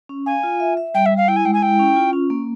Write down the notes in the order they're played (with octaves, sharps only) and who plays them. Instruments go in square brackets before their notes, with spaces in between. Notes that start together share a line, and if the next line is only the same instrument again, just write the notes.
[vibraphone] C#4
[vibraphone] F5 [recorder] G#5
[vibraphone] F4
E5
E5
[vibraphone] G3 [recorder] G5
[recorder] E5
[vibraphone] G3
[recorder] F5
[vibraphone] E4 [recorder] G5
[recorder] G#5
[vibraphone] G#3 [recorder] G5
[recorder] G#5
[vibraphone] E4 [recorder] G5
[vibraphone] C#4
F4
C#4
A#3